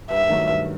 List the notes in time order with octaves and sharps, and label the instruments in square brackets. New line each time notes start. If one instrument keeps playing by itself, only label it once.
[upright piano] G2 [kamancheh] E5
[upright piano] D#3 F#3 A3
G2